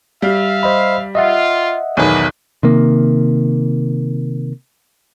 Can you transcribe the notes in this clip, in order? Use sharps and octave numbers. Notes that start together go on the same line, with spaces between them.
G3 E5 F5
C5 D#5 B5
F4 D#5 E5 F#5
B1 E2 D#3 G#4 B4
C3 D#3 A#3